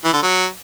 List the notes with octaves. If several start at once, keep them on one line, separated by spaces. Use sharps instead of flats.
E3
D3
F#3